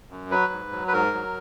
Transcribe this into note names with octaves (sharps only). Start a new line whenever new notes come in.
F#2
F#3 B4
G#2
F#3
B4
G#2 A#4
F#3